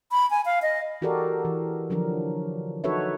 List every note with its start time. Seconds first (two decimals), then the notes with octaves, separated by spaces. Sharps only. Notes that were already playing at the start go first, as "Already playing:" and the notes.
0.12 B5
0.30 G#5
0.46 F5
0.62 D#5
1.02 E3 F#4 G4 A4 A#4 D5
1.45 E3
1.90 D3 F3 F#3 D4 A#4
2.84 D#4 F#4 A4 B4 C#5 E5